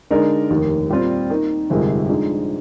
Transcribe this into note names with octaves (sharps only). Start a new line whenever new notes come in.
D3 G#3 D#4 A#4 D5
F1 D#2 D#3
A#2 G3 C4 F4 A#4
D#3 A#3 D#4 A#4
G1 F2 C3 D#3 G#3
D3 F3 G#3 D#4